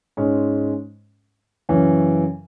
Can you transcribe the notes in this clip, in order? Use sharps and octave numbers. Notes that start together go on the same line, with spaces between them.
G#2 G#3 C#4
F#2 C#3 E3 C#4